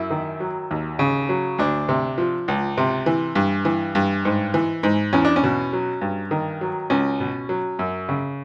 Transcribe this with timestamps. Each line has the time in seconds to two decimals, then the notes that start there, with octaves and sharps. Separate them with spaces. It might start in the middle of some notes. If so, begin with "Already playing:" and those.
Already playing: F#2 E4
0.10 D#3
0.40 F#3
0.71 D#2
0.99 C#3
1.29 F#3
1.58 D2 D4
1.89 C3
2.18 F3
2.48 C#2
2.77 C3
3.06 E3
3.35 G2
3.65 E3
3.95 G2
4.25 G#2
4.54 E3
4.83 G#2
5.13 E2 C#4
5.25 D4
5.36 C#4
5.43 B2
5.73 F#3
6.01 G2
6.31 D#3
6.61 F#3
6.90 C#2 C#4
7.20 B2
7.49 F#3
7.79 F#2
8.09 C#3